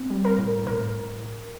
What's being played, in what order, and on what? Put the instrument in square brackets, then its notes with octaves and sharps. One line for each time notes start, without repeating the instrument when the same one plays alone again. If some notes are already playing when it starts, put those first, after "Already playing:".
Already playing: [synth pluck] C4
G3
A#4
A2
A2 A#4